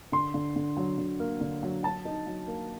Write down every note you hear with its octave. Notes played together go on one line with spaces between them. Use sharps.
D3 C6
D3
D3
F#3
D3
A#3
D3
F#3
F#3 A5
D#4
F#3
A#3